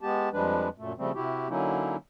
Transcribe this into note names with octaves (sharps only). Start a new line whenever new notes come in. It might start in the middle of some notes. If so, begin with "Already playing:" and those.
G#3 B3 G4 A5
F2 F3 G3 G#3 D4 B4
F#2 A#2 A3
C#3 F3 G3 A3 C4
C3 E4 F#4 G4
D3 F#3 A#3 C#4 D#4 E4